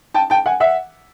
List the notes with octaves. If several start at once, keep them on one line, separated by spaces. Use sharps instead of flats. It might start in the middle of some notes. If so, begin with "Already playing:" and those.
G5 A5
G5 A5
F#5 G#5
E5 F#5